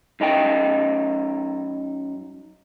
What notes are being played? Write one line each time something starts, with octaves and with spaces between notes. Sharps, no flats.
F#2 D#4 A#4 G5